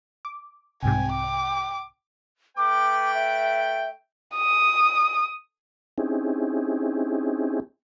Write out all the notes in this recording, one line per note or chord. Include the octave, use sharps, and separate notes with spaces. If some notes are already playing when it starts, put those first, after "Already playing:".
D6
C2 G#2 C3 G5 G#5
D6
A3 B4 G5 D6
E5
D#6
C4 C#4 D#4 E4 G4 G#4